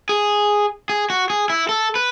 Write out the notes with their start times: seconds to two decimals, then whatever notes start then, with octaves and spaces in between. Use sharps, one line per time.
0.09 G#4
0.89 G#4
1.10 F#4
1.30 G#4
1.50 E4
1.69 A4
1.95 B4